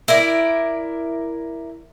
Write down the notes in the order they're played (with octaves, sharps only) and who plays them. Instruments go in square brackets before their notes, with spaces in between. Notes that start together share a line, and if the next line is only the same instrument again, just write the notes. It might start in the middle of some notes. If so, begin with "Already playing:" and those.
[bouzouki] E4 A#4 D5